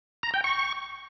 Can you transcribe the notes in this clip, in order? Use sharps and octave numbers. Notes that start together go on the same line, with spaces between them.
A#5
G5
C#6